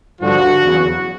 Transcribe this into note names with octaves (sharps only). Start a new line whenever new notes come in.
G2 D3 F3 F#4
E2 C#3 F#3 B3